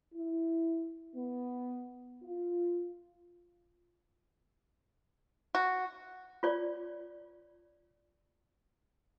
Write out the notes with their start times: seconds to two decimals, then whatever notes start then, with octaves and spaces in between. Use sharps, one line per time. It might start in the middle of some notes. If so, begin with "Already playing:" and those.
0.13 E4
1.16 B3
2.23 F4
5.55 F#4
6.43 F4 C#5 D5